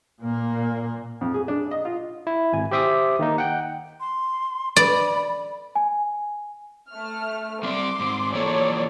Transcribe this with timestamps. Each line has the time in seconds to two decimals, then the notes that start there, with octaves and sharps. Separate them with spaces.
0.22 A#2 A#3
1.21 F2
1.34 G#4
1.48 D4
1.71 D#5
1.85 F4
2.27 E4
2.53 G#1 G#5
2.71 G4 C5 E5 D6 D#6
3.19 D#3 A#3 D#4
3.38 F#5 G5
4.00 C6
4.76 D5 B5
5.76 G#5
6.90 A3 F6
7.63 G3 C4 D5 C6 D6
7.99 G#2 C4
8.34 E3 F3 A#3 A4 C#5 D5